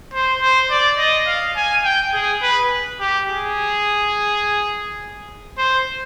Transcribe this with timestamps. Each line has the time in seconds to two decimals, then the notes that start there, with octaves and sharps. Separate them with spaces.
0.13 C5
0.41 C5
0.71 D5
0.98 D#5
1.27 F5
1.57 G#5
1.84 G5
2.14 G#4
2.42 B4
3.00 G4
3.29 G#4
5.58 C5